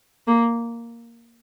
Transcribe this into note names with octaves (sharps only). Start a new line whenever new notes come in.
A#3